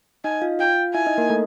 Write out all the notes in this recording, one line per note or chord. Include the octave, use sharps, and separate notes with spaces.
D#4 D#5 G#5
F4 F5
F4 F5 G5
E4 E5 G#5
D#4 D#5
A#3 A#4
A3 A4